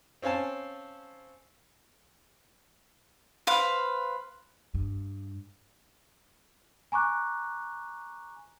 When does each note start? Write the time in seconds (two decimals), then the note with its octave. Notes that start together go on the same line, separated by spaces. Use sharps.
0.22 C4 C#4 F5 G#5 A5
3.47 B4 C5 F5 B5
4.75 G2
6.92 G#5 A#5 C#6 D6 F#6